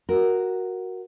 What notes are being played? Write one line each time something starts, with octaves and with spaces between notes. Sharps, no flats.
F#4 A#4